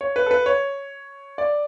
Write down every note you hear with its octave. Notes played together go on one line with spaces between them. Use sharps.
C#5
B4
A4
B4
C#5
D5